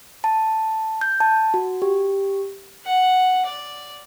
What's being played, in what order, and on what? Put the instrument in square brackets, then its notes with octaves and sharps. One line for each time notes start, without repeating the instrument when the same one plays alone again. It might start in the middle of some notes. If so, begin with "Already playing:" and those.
[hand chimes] A5
G6
A5
F#4
G4
[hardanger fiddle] F#5
D5